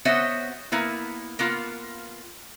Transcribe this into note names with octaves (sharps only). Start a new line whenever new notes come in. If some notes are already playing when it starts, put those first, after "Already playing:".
B3 F#4 C5 C#5 D#5 E5
A#3 B3 E4
A#3 B3 F4